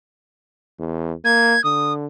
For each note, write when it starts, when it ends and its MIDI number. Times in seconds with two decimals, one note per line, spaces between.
0.79 1.13 40
1.25 1.56 58
1.25 1.63 92
1.64 2.06 50
1.64 1.93 87